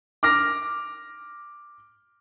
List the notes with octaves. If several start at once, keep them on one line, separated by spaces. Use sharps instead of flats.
D6 F6 A#6